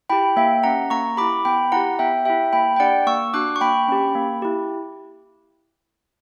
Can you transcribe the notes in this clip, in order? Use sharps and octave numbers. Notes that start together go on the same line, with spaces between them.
E4 G4 G5 B5
A#3 E5 G5
C#4 G4 F#5 A#5
A#3 A#5 C#6
E4 G4 B5 D6
B3 G5 B5
E4 G4 F#5 A#5
B3 E5 G5
E4 G4 E5 G5
A#3 G5 B5
G5
D4 G4 D5 F#5
A#3 C#6 E6
D4 F#4 D6 F#6
C#6
A#3 G5 B5
C#4 G4
A#3
E4 G4